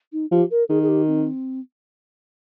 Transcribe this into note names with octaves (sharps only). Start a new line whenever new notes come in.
D#4
F3 G4
A#4
D#3 G#4
G#4
G4
C4